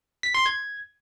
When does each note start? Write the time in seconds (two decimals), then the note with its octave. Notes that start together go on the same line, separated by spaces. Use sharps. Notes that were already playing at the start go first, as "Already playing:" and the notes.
0.23 B6
0.34 C6
0.46 G#6